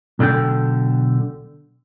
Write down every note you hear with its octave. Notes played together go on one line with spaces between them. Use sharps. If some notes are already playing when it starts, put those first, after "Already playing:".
B1 D3 D4 A4 G5